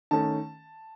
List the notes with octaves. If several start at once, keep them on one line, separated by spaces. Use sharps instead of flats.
D#3 A3 C#4 A5